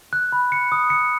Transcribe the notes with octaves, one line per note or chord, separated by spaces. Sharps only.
F#6
B5
C#7
D#6
C#7